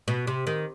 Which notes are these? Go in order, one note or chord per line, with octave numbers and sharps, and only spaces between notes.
B2
C3
D#3